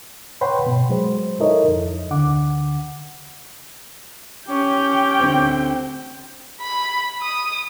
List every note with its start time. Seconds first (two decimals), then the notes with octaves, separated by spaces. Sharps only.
0.41 B4 C#5 F#5 G5 B5 C6
0.63 G2 B2
0.89 F#3 G#3 C5
1.40 D#4 E4 A4 A#4 C#5 D#5
1.67 F2
2.10 D2 D3 F#5 D6
4.48 C#4 G4 G5
5.19 D2 C4
6.61 B5
7.23 D#6